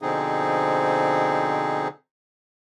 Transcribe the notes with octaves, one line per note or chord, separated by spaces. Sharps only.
B2 D3 F3 C4 D#4 G#4